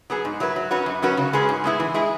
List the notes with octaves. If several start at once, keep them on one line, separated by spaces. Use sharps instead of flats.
F#3 B3 G#4
G#2
F#3 E4 B4
F#3
C#4 F#4 B4
F#2
F#3 C#4 F#4 B4
C#3
G#3 C#4 G#4 B4
G#2
G#3 B3 E4 G#4
E3
G#3 E4 G#4